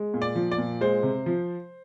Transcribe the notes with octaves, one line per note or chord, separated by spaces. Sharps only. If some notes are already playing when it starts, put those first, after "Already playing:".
Already playing: G#3
A#2
D5
F3
D5
A#2
G#3 C5
C3
F3